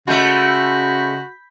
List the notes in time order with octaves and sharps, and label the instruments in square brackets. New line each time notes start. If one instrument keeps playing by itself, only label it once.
[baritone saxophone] C#3 [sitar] G#3 A3 [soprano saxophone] F#4 [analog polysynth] B5 G6 B6